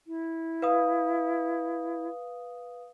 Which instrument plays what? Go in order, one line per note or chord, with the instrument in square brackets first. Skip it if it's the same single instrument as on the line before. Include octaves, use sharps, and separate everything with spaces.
[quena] E4
[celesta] B4 F5 D#6